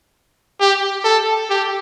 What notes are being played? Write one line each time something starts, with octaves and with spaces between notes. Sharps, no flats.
G4
A4
G4